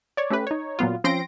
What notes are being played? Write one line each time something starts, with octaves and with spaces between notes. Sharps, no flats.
C#5 D5
A3 C#4 G4 B4
D#4 C#5
A#2 F#3 B3 F4
F3 C4 C#4 C6 A#6 D7